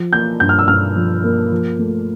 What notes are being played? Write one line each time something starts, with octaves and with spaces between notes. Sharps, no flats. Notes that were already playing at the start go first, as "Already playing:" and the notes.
Already playing: F3
A#3 G6
G2 G6
F6
E6
G2 F6
F3
A#3
F3
A3